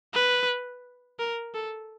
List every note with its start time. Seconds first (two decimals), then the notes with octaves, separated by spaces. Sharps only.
0.14 B4
1.19 A#4
1.54 A4